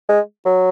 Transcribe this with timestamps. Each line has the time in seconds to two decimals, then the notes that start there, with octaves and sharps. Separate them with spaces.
0.09 G#3
0.46 F#3